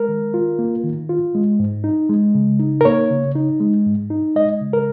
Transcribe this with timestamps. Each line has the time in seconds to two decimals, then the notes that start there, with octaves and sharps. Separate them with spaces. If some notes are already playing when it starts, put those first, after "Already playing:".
Already playing: G#3 A#4
0.09 D#3
0.34 F4
0.59 A#3
0.84 D#3
1.09 F4
1.35 G#3
1.60 G#2
1.84 D#4
2.09 G#3
2.35 C#3
2.59 D#4
2.81 A#4
2.85 A#3 C#5
3.10 C#3
3.35 D#4
3.60 G#3
3.86 G#2
4.10 D#4
4.36 G#3 D#5
4.61 C#3
4.73 A#4